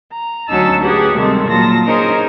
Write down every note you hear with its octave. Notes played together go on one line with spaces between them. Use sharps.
A#5
D2 F#3 C#4 D#4 A5 E6
C#4 G4 G#4 B4 F#5
C3 D#3 G3 G#3 C4 A4
A#2 F#3 F4 A5 A#6
C#4 D#4 G#4 A#4 C5